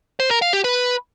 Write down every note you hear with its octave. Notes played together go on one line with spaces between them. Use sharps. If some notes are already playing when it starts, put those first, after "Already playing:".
C5
A#4
F5
G4
B4